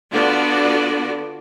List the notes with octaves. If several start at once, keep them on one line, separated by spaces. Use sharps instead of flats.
D3 B3 D4 F4 F#4 D5